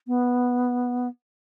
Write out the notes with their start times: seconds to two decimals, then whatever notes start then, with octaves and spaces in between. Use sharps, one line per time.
0.07 B3